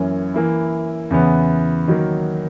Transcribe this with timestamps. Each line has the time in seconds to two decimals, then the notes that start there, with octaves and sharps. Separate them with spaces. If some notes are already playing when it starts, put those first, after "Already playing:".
Already playing: F#2 E3 A#3 C#4
0.34 E3 A#3 E4
1.11 E2 C#3 E3 B3
1.88 D#3 F#3 A#3